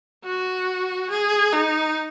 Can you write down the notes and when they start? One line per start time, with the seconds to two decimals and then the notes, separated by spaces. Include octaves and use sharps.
0.24 F#4
1.10 G#4
1.53 D#4